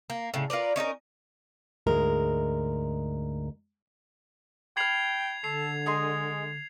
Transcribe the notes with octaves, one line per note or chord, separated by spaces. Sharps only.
A#3
A2 C#3
F4 A#4 B4 D5
C#4 D#4 A4 A#4
D2 G#2 G#3 A#4
G5 B5 F6 G#6 C7 F7
D3 A4 C7 F7
G#3 G#4 D#5 C6